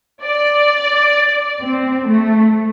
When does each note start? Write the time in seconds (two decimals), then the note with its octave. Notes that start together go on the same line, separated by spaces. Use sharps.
0.23 D5
1.62 C4
2.09 A3